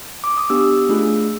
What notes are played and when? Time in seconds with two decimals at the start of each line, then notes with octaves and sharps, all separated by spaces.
0.24 D6
0.37 D#6
0.50 B3 D4 G4 E6
0.89 A3 D4 F4 G#4